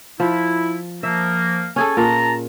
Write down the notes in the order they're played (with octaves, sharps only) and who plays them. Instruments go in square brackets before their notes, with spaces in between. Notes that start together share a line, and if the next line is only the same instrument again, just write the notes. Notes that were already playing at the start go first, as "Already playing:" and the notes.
[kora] F3 [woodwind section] E4
[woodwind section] F3 A#3 [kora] E5
[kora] C#4 G#4 A4 [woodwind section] G#5
[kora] A#2 [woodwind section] A5 A#5